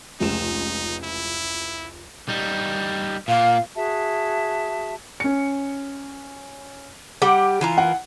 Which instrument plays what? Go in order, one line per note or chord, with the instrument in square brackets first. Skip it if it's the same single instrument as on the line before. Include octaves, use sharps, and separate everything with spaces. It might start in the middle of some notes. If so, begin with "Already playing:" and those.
[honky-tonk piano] F1 C#2 E7 [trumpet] D#4
[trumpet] E4
[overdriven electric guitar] G3 D#4
[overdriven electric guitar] A#2 A#3 [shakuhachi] F5
[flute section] F#4 G#4 E5 A5
[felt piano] C#4 C#7
[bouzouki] G3 G4 F#5
E3 F4 A#4
[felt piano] F#5